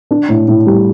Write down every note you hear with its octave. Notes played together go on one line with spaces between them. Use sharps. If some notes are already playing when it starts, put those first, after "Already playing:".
D4
A2
A2
G3